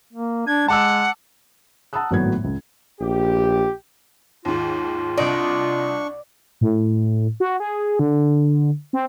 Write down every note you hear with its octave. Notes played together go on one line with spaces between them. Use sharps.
A#3
D4 G#6
G#3 F#5 A5 D6 E6
F#5 A5 A#5 D#6 E6 F#6
G#1 A2 F#3 B3 G#6
C#2
A#1 G4
D#2 G#2 F4
C2 D4 D5 D#5 C#6
A2
F#4
G#4
D3
C4